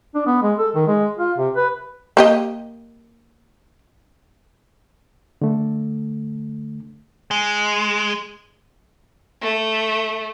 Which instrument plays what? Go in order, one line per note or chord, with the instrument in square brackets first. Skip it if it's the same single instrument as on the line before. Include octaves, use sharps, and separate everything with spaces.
[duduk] D4
B3
G#3
A4
D#3
G#3
F4
C3
B4
[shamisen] A#3 G4 D#5
[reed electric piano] D3 A3
[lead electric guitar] G#3
[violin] A3